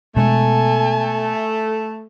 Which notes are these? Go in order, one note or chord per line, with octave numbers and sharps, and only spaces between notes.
B2 G#3 A3 G#5 A5